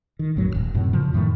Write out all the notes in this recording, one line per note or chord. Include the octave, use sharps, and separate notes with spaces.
D#3
A#1 F#2 A2 F#3
D#1 C2
F#2 A2 C3
G2 C#3 F3
F#2 A2 D#3 A3